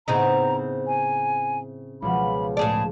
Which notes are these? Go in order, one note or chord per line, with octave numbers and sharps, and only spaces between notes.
A2 C#3 B3 C4 D#4 A#5
G#5
C#2 B2 F3 B5
A2 G#4 D5 A5